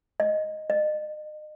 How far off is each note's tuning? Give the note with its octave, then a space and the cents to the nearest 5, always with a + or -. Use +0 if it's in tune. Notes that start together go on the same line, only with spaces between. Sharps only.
D#5 +0
D#5 -35